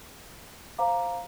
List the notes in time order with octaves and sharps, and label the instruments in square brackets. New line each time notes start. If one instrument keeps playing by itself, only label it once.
[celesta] C5 F5 A#5 D6